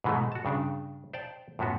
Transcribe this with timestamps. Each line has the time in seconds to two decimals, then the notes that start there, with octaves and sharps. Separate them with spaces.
0.04 G#2 B2 E3 G#3 A3
0.32 F#4 A5
0.45 G2 C#3 D4
1.13 C5 D5 F5 G5 A5
1.59 F#2 A2 F3 B3 F#4